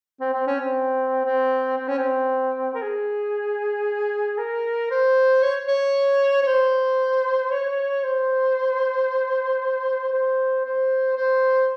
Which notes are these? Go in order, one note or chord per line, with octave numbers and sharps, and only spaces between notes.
C4
C4
C#4
C4
C4
C4
C#4
C4
A#4
G#4
A#4
C5
C#5
C#5
C#5
C5
C#5
C5
C5
C5
C5